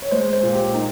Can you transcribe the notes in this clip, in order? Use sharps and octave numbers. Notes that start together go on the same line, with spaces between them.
C#5
G#3 C5
C5
A#2
G4
A#3 D#4